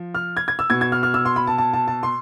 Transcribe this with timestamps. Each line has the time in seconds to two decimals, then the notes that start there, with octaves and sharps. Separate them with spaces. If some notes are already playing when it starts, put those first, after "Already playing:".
Already playing: F3
0.15 F6
0.37 G#6
0.48 G#6
0.59 E6
0.70 B2 G#6
0.81 G#6
0.92 F6
1.03 F6
1.14 E6
1.25 C6
1.36 B5
1.47 A5
1.58 A5
1.73 A5
1.88 A5
2.03 C6